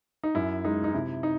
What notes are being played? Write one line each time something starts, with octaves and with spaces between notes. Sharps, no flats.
D#4
F#2 E4
G#3 D#4
D#4
C3 E4
D#4